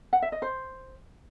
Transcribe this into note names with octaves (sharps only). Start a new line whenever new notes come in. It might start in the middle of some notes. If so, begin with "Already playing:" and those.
F#5
E5
D#5
C5